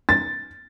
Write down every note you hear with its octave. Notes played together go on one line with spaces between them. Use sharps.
A6